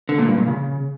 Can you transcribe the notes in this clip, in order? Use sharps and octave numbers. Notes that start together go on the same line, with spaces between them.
D3
A#2
G2
A#2
C#3